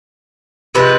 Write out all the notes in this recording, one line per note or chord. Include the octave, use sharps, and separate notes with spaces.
C3 F3 G#3 B4